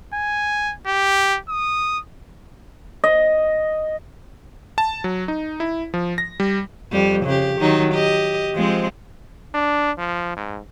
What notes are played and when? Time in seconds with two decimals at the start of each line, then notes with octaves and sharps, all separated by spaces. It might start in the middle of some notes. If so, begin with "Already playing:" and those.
0.14 G#5
0.86 G4
1.49 D#6
3.04 D#5
4.78 A5
5.04 F#3
5.28 D#4
5.60 E4
5.94 F3
6.18 A#6
6.40 G3
6.92 F2 G3
7.25 C#3 G4
7.60 D#3 F#3 D#4
7.94 G4 D#5
8.55 F3 G#3 C4
9.54 D4
9.98 F3
10.37 G#2